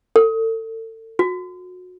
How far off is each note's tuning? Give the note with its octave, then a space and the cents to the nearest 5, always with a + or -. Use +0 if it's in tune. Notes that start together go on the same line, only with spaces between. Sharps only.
A4 +35
F#4 -30